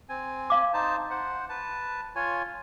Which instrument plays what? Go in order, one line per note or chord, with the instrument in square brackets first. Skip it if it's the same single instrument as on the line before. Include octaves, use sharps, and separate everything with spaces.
[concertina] C4 G#5
[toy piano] F5 D6
[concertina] D#4 C5 A5
C5 F#5
B4 A5
F4 C#5 G#5